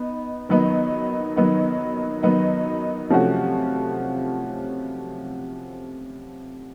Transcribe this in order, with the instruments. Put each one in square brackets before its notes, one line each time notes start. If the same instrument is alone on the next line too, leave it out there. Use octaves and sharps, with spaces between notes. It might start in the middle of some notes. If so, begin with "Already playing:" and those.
Already playing: [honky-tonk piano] B3 D#4
D#3 F#3 B3 D#4
D#3 F#3 B3 D#4
D#3 F#3 B3 D#4
C3 F3 A3 C#4 F#4